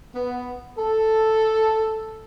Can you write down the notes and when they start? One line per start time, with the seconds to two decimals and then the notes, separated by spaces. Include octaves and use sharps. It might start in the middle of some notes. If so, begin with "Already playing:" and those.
0.15 B3
0.77 A4